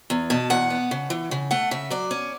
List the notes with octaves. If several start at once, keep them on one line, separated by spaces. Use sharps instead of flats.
E2
B2 A5
E2 F#5
B3
C#3
E3
C#3
A3 F#5
C#3 E5
F#3 D5
C#4